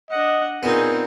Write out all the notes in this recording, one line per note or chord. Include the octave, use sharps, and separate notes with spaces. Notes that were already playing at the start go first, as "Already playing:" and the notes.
D4 D#5 F#5
A#2 B3 C4 D#4 G#4